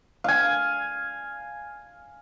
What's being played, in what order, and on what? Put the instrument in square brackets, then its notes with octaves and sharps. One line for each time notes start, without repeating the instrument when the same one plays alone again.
[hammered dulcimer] F5 G#5